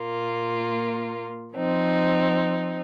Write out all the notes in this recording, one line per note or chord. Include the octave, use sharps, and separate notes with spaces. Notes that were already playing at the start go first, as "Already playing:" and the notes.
Already playing: A#2 A#3 F4
F3 C4 D#4